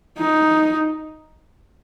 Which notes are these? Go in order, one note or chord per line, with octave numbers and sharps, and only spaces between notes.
D#4